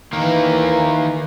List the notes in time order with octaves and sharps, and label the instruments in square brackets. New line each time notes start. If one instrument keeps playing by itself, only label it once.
[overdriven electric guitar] D#3 A#3 [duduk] E3